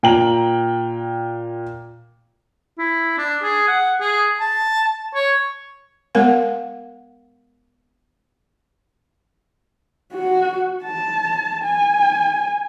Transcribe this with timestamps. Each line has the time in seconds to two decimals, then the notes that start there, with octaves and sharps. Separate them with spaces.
0.03 A#2 G5 A#5 F#7
2.78 E4
3.18 D4
3.43 G#4
3.68 F#5
4.00 G#4
4.40 A5
5.14 C#5
6.15 G#3 B3 A#4 F5 F#5
10.13 F#4
10.83 A5
11.63 G#5